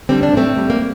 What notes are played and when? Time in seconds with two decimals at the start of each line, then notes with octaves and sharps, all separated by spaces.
0.09 D3 G3 C4
0.23 D4
0.33 A2 A3 C4
0.57 G3
0.70 A#3